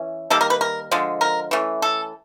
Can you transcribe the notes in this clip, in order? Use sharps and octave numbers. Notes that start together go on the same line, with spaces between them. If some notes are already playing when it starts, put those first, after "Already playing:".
Already playing: E3 C#4
D#3 G3 A#3 A4
A#4
B4
A#4
D3 F3 G#3
A#4
E3 A3 C#4
A4